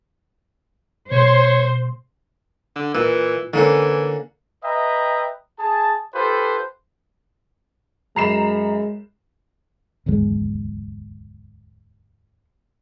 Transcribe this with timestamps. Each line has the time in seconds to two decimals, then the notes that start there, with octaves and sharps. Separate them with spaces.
1.11 B2 C5 C#5
2.76 D3
2.95 A#2 E3
3.54 D3 E3 A#3 C#4
4.64 B4 D#5 E5 G5 A#5
5.59 G#4 A5
6.14 F4 G4 A4 B4 C5
8.16 F#2 G#3 A#5 B5 C7 E7
10.06 D1 G#1 E2 G#3